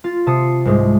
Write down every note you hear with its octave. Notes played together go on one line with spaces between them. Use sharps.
F4 A6
C3 A5 D#6 C7 C#7
C2 G#2 G#3